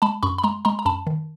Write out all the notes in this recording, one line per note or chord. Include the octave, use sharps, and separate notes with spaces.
G#3 A5 B5
F#2 B5 C#6
B5
G#3 A#5 C6
G#3 A#5 C6
A#5
F#2 A5 B5
D#3